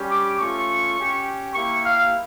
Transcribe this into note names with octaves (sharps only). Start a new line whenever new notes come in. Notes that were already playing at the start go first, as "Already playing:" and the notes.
Already playing: G3 C#4 G4
D6
A3 C#4 F4 C#6
C#4 G4
A#3 E4 G4 C#6
F5